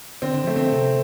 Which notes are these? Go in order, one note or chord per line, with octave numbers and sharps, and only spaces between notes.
D3 C4
D3
F3
A3
D3 C4
C3